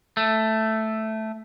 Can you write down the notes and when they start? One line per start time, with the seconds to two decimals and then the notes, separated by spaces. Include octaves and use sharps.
0.17 A3